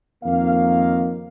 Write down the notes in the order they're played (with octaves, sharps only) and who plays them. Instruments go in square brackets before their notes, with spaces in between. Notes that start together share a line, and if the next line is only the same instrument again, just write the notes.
[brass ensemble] F2 D#3 A#3 F5